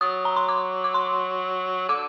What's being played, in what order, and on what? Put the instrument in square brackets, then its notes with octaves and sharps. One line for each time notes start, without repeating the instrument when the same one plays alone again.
[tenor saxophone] F#3 [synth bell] D#6
[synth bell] A#5
C6
D6
D6
C6
[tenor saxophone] D3 [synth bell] D6